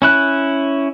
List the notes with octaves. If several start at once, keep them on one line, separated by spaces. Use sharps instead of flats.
C#4 E4 F#6